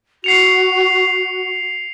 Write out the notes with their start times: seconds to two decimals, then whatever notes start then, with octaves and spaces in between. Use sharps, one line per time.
0.24 F#4 C7 C#7 F7